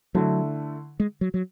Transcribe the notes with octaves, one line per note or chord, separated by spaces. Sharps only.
D3 F#3 A3 E4
G#3
F#3
F#3